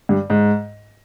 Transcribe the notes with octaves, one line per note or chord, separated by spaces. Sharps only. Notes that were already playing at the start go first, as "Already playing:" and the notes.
G2
G#2